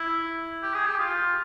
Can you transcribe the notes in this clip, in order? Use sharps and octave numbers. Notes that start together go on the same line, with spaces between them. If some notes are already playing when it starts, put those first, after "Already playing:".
Already playing: E4
G4
G#4
G4
F4